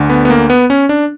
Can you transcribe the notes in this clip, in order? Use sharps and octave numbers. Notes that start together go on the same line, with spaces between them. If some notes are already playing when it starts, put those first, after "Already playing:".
Already playing: D2 D3
B3
B3
A#3
B3
C#4
D4